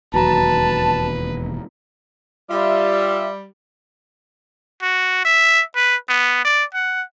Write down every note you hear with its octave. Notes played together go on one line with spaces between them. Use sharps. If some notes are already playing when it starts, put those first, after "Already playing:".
E1 D#2 F#3 B4 A5 A#5
G3 F4 E5
F#4
E5
B4
B3
D5
F#5